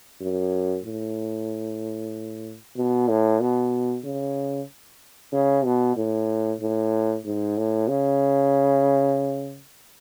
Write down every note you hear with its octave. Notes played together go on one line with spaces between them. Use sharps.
F#2
A2
B2
A2
B2
C#3
C#3
B2
A2
A2
G#2
A2
C#3